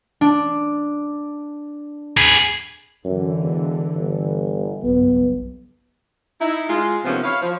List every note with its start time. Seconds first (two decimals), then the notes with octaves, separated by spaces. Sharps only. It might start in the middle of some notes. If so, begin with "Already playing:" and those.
0.21 D4
2.17 G#4 B4
3.05 F#2 D3 E3
3.38 E1
3.95 G1
4.83 F#1 B1 G2 B3
6.41 D#4 E4
6.69 G#3 F4
7.05 C3 D#3 F3 B3 C#4
7.23 E4 C#5 F5
7.42 F3